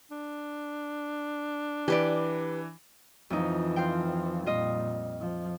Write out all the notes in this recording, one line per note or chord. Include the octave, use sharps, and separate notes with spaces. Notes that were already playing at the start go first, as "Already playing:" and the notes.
D4
E3 G4 B4 D5
F2 E3 F3 D#4
C5 F5 G5
A#2 G3 F4 D#5
F3